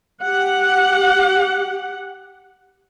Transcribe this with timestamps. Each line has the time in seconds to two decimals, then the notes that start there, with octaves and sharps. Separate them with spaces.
0.21 G4 F#5